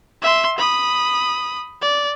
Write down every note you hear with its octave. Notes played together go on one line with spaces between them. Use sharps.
E5 C6
B5 D#6
D5